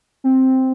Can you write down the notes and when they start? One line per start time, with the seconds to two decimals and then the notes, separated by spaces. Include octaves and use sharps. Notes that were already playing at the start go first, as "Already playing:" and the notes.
0.24 C4